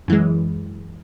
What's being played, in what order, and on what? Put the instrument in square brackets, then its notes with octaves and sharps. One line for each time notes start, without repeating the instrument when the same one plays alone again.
[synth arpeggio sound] F#2 E3 G#3